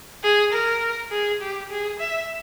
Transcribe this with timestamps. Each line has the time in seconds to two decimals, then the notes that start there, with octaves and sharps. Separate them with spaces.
0.24 G#4
0.52 A#4
1.11 G#4
1.41 G4
1.70 G#4
1.99 E5